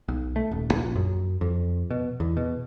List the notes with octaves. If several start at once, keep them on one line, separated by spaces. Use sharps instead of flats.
B1
A3
D#1
A#1
F#2
F2
B2
E2
B2